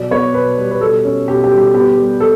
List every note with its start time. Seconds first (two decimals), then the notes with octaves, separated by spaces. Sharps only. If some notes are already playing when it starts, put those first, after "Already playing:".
Already playing: B2 F#3 D5
0.11 B3 C#5
0.34 B2 B4
0.58 G3
0.71 B4
0.80 B2 A4
1.05 C#4
1.27 B2 G4
1.44 G4
1.51 G3
1.58 G4
1.74 B3 G4
1.98 G3
2.20 A4